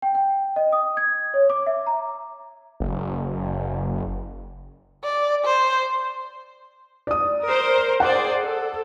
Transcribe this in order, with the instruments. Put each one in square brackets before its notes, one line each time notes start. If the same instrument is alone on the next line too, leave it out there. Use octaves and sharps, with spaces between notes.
[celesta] G5
G5
D#5
D#6
G#6
C#5
D6
E5
A#5
[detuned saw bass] F#1
[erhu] D5
C5
[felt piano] D5 D#6
[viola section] A#4 C5
[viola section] G#4 C5 D5 [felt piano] F#5
[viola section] A4